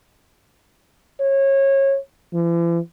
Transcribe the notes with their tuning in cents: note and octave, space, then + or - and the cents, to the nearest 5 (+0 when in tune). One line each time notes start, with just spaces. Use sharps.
C#5 -25
E3 +45